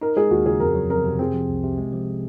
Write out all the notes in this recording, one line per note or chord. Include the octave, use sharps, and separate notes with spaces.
D#4 A#4
G#3 G#4
D#2 F#4
C#3 G#4
F2 A#4
F#3
F2 A#4
C3
C4 G#4
F3
C2
C3
G#3
F3